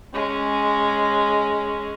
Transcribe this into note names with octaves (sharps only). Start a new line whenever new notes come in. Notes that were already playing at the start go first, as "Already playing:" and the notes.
G#3 C#4